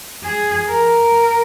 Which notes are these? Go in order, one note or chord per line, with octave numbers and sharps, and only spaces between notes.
G#4
A#4